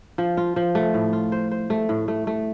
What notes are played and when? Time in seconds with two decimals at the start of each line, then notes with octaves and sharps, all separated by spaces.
0.18 F3
0.37 F4
0.56 F3
0.75 A3
0.94 A2
1.13 F4
1.32 C5
1.51 C5
1.70 A3
1.89 A2
2.08 A3
2.27 A3